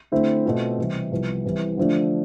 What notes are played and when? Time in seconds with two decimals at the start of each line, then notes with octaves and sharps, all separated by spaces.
0.12 D3 A3 C4 E4
0.45 B2 A3 C4 F4
0.79 C3 E3 G3
1.11 C2 C3 F3 B3
1.45 C2 C3 E3 B3
1.77 D3 F3 A3 D4